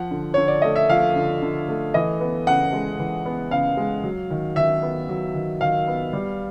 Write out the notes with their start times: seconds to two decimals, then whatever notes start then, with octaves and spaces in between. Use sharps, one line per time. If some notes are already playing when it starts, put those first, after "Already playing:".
Already playing: F3 F#5
0.11 D3
0.34 D3 C#5
0.48 D5
0.62 A3 D#5
0.76 E5
0.89 F3 F5
1.16 D3
1.42 D3
1.69 A3
1.94 E3 D#5
2.21 B3
2.47 C#3 F#5
2.73 G#3
2.99 E3
3.26 B3
3.51 C#3 F5
3.77 G#3
4.04 F#3
4.30 D#3
4.56 D#3 E5
4.83 B3
5.09 F#3
5.35 D#3
5.61 D#3 F5
5.87 B3
6.13 G3